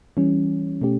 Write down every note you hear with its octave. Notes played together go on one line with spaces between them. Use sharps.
E3 G3 C#4
B2 A3 C#4 G4